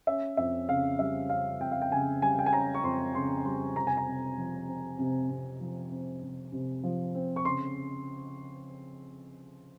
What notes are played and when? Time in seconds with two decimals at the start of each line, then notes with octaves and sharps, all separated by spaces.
0.07 C#4 E5
0.37 F2 E5
0.68 C#3 F5
0.99 G3 E5
1.29 C#4 F5
1.60 F2 G5
1.72 F5
1.82 G5
1.91 C#3 G#5
2.22 G3 G#5
2.39 G5
2.46 G#5
2.53 C#4 A#5
2.75 C#6
2.84 F2 C6
3.15 C#3 C6
3.45 G3 C6
3.76 C3 A#5
3.87 G#5
3.97 A#5
4.07 C3
4.38 F3
4.68 C4
4.99 C3
5.30 C3
5.60 F3
5.91 C4
6.22 C3
6.52 C3
6.83 F3
7.15 C4
7.36 C#6
7.45 C#3 C6